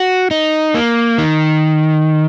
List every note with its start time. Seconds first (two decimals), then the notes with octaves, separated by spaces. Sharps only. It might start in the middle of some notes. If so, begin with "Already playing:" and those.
Already playing: F#4
0.31 D#4
0.74 A#3
1.18 D#3